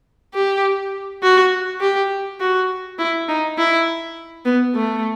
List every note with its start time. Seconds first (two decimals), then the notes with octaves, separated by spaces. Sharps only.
0.34 G4
1.23 F#4
1.80 G4
2.40 F#4
2.99 E4
3.28 D#4
3.58 E4
4.45 B3
4.75 A3